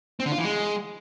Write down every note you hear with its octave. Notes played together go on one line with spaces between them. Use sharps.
C4
D3
F4
E3
G#3